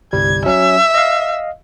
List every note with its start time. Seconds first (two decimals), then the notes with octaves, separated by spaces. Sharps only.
0.13 G1 C2 G3 G#6
0.46 F#3 C#4 E5
0.94 D#5 F5